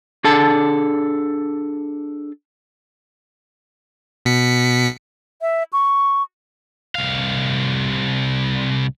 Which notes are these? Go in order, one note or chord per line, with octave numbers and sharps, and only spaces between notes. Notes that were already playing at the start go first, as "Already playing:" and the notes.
D4 G#4 A4 A5
B2 B6 C#7
E5
C#6
C2 F5